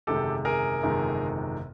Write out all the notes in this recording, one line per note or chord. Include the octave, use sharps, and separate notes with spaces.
G1 F2 C3 D#3 G#3 G4 A4
G#4 A#4
G1 F2 C3 D#3 G#3